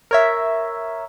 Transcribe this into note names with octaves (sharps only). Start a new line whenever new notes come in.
A#4 C#5 E5